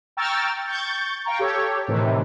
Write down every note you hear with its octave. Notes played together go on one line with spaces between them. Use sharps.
G5 A#5 C#6 E6 F6 A6
C#6 G6 A6
F5 G5 A#5 C#6
G4 A4 C#5
A2 C3 D#3 E3